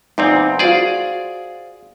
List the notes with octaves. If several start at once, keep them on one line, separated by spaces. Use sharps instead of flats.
E2 A#2 C4 D#4
F4 F#4 G#4 C5 D5